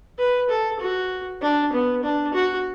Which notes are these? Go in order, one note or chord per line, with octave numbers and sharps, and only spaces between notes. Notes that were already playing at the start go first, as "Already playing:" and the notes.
B4
A4
F#4
D4
B3
D4
F#4